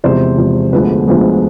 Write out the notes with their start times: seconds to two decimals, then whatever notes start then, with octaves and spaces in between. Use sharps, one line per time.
0.04 E2 C3 F3 G#3 C5
0.38 E2 C3 F3 G#3
0.72 D2 D3 F3 G#3 B3 B4
1.07 D2 D3 F3 G#3 B3